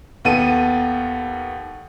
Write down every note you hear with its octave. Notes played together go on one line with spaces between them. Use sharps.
D#2 B3 A4 D#7